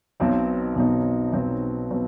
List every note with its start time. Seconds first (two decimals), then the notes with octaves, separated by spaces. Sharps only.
0.20 B1 B2 F#3 C4 D#4
0.76 B1 B2 F#3 C4 D#4
1.33 B1 B2 F#3 C4 D#4
1.91 B2 F#3 C4